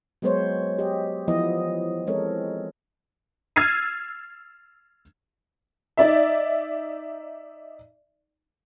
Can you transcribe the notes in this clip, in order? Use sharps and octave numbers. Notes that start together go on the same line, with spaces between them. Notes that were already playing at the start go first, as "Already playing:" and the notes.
F#3 G#3 B3 C5 C#5
G4 D#5
E3 F3 B3 E4 D#5
G#3 C4 A4 A#4 C#5
E6 F6 G#6 A6 C7 D#7
D#4 D5 E5